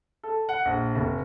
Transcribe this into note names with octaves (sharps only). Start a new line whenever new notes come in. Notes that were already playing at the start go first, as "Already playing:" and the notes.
A4
F#5
A#1
F1